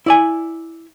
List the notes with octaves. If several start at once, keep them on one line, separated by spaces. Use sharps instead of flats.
E4 D5 G#5